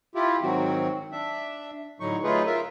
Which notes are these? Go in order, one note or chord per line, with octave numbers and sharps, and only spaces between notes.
E4 F4 G4
G#2 D#3 F#3 C4 F#4
D4 E5
A2 D3 F#3 D#4 C#6
F#3 A3 D#4 F4 G#4 B4
F4 A#4 E5